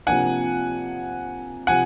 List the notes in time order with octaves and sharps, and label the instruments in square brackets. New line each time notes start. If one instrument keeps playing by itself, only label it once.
[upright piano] C3 F3 A#3 D4 [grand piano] F#5 G#5
[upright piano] C3 F3 [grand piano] F#5 G#5